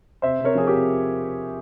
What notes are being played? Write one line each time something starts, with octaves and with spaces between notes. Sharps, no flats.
C3 C5 E5
C3
A#4 C#5
F3 G#4
C3 G4 A#4